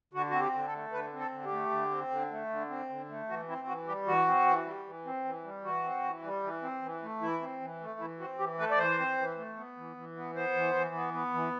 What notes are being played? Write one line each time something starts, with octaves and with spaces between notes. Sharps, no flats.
D3 F#4
C4 F#4
G4
D3
A4
A3
D3 B4
C4
A4
D3
G4
A3
D3
C4
D3
A3
D3
C4
D3
A3
E3 F#4
C4 E4
E3 F#4
G3 G4
E3 F#4
C4
E3
G3
E3
C4
E3
G3
E3 F#4
C4
E3
G3
E3
C4
E3
A3
E3 E4
C4
E3
A3
E3 E4
C4 F#4
E3 G4
A3 B4
D5
E3 C5
C4
E3
A3
B3
E3
E3
B3
B3 C5
E3
E3
B3
B3
E3